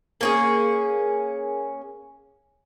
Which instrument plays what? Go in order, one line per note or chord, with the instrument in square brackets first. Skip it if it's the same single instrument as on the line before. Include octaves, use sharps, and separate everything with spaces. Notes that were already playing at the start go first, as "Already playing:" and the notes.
[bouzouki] A#3 C#4 G#4